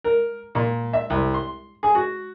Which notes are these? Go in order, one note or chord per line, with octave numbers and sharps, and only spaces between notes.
A#4
A#2
E5
C2
C6
G#4
F#4